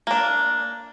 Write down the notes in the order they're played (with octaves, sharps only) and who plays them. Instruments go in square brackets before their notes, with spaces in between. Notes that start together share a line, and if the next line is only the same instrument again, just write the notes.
[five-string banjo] A#3 D4